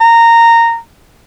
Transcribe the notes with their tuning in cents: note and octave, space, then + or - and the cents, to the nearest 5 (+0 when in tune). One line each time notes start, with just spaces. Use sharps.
A#5 -15